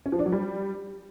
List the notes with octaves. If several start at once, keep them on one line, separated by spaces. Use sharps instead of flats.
C#4
F3
D4
F#3
G3